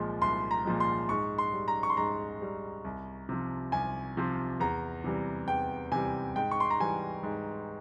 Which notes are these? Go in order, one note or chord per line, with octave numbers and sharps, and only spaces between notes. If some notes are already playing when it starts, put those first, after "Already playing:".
Already playing: C2 A#2 F3 G#3
C2 C6
A#5
A#2 F3 G#3
C6
G#2 C#6
C6
G3
A#5
C#6
C6
G#2 A#5
G3
C2
C3 F3
C2 G#5
C3 F3
E2 A#5
C3 E3 G3
E2 G5
C3 E3 G3 G#5
G#2 G5
C#6
C6
A#5
E3 G3 G#5
G#2